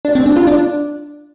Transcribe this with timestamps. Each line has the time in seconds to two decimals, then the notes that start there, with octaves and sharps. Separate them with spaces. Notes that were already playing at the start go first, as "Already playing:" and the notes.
0.05 D4
0.15 C4
0.26 D4
0.36 F4
0.47 D4